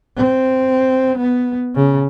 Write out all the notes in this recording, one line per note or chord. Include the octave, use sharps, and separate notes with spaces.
C4
B3
C#3